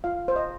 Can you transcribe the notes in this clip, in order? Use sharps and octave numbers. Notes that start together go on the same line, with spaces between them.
F4 F5
C5
D#5